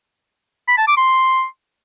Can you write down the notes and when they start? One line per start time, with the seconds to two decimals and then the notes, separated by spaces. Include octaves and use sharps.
0.68 B5
0.78 A5
0.87 D6
0.97 C6